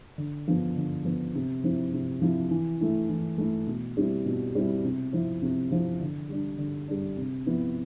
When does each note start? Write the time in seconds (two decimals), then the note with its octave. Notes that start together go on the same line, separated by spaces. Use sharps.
0.18 D3
0.48 F3 B3
0.77 D3
1.05 F3 B3
1.35 C3
1.63 F3 C4 E4
1.93 C3
2.22 F3 C4 E4
2.51 E3
2.81 A3 E4
3.09 E3
3.38 A3 E4
3.67 B2
3.97 G3 C4 E4
4.26 B2
4.55 G3 C4 E4
4.85 C3
5.13 F3 C4 E4
5.42 C3
5.72 F3 C4 E4
6.01 D3
6.29 G3 D4
6.58 D3
6.88 G3 D4
7.18 C3
7.46 F3 B3 E4